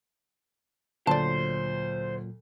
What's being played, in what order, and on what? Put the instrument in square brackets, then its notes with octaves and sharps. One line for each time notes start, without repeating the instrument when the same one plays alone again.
[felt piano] D2 [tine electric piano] A#2 F#3 [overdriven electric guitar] C5 [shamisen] D5 A5